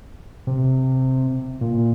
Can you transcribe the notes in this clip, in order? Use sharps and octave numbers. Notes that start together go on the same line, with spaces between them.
C3
A#2